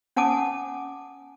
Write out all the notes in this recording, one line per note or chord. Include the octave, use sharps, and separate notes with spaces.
C#4 F#5 G#5 A5 D6 D#6